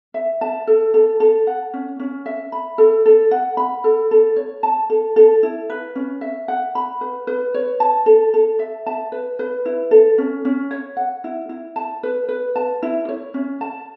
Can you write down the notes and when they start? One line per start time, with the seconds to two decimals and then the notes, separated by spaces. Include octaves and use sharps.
0.14 E5
0.41 A5
0.67 A4
0.94 A4
1.20 A4
1.47 F#5
1.74 C#4
2.00 C#4
2.26 E5
2.52 B5
2.78 A4
3.06 A4
3.31 F#5
3.57 B5
3.84 A4
4.11 A4
4.36 C#5
4.63 A5
4.90 A4
5.16 A4
5.43 E4
5.70 B4
5.95 C#4
6.21 E5
6.48 F#5
6.75 B5
7.01 B4
7.27 B4
7.54 C#5
7.80 A5
8.06 A4
8.34 A4
8.59 E5
8.86 A5
9.12 B4
9.39 B4
9.65 E4
9.91 A4
10.18 C#4
10.45 C#4
10.71 C#5
10.97 F#5
11.24 E4
11.49 E4
11.76 A5
12.03 B4
12.29 B4
12.56 A5
12.83 E4
13.09 C#5
13.34 C#4
13.61 A5